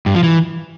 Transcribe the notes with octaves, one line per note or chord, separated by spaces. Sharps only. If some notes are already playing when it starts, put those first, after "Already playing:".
G2
F3
E3